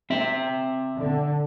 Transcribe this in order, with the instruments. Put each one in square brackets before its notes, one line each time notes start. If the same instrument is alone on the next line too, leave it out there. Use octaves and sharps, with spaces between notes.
[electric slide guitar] C4 E5
[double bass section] D3